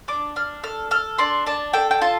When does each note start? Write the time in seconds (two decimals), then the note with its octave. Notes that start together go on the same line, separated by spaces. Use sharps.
0.08 D4 D6
0.36 D4 F6
0.63 A4 F6
0.91 A4 F6
1.18 D4 C6
1.46 D4 A5
1.73 A4 G5
1.91 G5
2.01 F4 A5